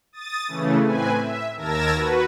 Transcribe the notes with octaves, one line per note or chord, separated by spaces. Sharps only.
D#6 A6
C#3 E3 A3
A2 C4 B4 G#5
E5
D#2 A#4 A5 E6 G#6 A#6
F#4 B4